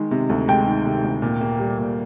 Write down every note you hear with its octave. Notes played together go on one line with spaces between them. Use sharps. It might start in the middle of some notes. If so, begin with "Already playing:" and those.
Already playing: D#3 G#3
C3
D2
G#3 G5
D#3
C3
D2
A#2
A#3
G3
A#2